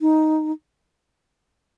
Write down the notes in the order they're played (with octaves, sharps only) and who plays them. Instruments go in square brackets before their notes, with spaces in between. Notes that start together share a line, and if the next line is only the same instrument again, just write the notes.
[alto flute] D#4